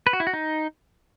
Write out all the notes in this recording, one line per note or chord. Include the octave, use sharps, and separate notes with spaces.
B4
F#4
E4
F#4
D#4